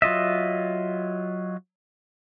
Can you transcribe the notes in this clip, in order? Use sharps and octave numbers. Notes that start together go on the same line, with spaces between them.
F#3 F4 D#5 E5